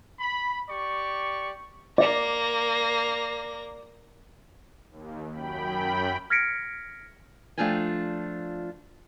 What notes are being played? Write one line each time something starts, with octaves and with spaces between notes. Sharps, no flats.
B5
G4 D5 C#6
A#3 D5 A#6
D#2
F#2 G5 B5
F6 G#6 A#6 B6 C#7 D7
F3 A3 D4 F4 G5 G#5